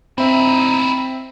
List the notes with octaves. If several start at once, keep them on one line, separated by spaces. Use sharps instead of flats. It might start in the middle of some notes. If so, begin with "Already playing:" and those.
C4 D#4 E4 E5